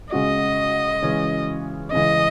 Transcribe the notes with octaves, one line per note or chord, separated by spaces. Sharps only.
C#3 G#3 C#4 F#4 D#5
C#3 E3 G#3 C#4
C#3 E3 G#3 C#4 D#5